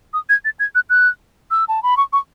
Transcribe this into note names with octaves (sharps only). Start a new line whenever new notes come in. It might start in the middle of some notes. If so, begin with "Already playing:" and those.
D#6
G#6
A6
G#6
F#6
F#6
E6
A5
B5
C#6
C#6